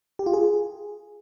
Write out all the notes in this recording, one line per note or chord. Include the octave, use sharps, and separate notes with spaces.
G4
F4
G#4